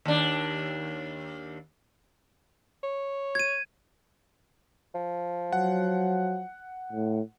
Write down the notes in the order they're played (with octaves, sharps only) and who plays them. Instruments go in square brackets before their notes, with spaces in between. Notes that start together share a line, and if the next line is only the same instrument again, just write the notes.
[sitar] D#2 D4
[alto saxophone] C#5
[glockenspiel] G#6 D#7
[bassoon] F3
[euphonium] F#3 [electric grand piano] F#5
[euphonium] A2